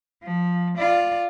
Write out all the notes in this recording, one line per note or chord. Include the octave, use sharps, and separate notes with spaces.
F3
F4 D5